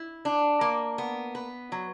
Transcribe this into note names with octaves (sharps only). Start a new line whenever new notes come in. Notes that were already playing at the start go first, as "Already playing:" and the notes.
Already playing: E4
D4
A#3
B3
B4
F#3